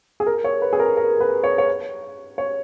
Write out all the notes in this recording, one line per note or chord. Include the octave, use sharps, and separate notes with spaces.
G#4
A#4
C#5
B4
G#4
A#4
A#4
B4
C#5
C#5
C#5